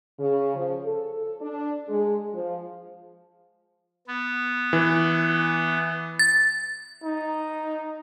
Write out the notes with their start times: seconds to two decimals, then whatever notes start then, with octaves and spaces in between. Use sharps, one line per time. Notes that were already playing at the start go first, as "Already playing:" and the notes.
0.19 C#3
0.56 F3
0.84 A4
1.41 D4
1.88 G#3
2.34 F3
4.07 B3
4.73 E3
6.19 A6
7.03 D#4